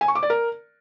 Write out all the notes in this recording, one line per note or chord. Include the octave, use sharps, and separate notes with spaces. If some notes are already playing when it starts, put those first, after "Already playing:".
G#5
C#6
D6
D5
A#4